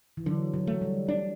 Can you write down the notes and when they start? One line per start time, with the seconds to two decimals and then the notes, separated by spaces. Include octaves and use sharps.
0.17 E3
0.26 D3 F#3
0.54 F#3
0.67 A3
0.81 G3
1.08 D4